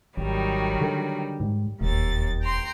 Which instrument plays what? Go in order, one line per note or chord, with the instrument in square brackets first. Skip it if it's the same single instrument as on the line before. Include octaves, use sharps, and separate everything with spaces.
[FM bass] G#1 [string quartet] D#3 F#3 G3
[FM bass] D3
G#2
[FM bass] E1 [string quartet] D#2 A6
[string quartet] G5 A#5 C6